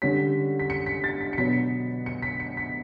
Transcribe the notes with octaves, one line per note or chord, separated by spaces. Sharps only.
D3 G3 C#4 B6
B6
C#7
B6
A6
B6
C#7
B2 F#3 B3 D4 B6
C#7
B6
C#7
B6